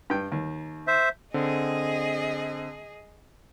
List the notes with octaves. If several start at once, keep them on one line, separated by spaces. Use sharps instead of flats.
G2 G5
D#2
C5 E5
D3 C4 G#4 D#5